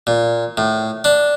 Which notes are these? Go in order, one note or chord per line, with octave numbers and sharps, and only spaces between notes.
A#2
A2
D4